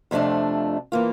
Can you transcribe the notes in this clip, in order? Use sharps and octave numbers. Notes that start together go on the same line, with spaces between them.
F2 C3 F3 A3 D4
E3 A#3 F4